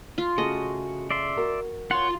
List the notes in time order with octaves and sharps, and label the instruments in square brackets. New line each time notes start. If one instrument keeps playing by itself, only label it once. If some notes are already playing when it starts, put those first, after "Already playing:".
[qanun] F4
[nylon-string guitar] C#3 A3 G#4 [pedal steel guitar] F#4 [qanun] D#5
[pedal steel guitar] D5 E5 C6
[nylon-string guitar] F#4 A#4
[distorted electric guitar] F4 [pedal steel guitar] C#5 F#5